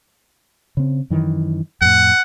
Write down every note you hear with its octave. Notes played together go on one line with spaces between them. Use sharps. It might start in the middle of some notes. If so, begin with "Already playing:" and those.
C#3 C4
F#2 D#3 E3
F2 A2 F#5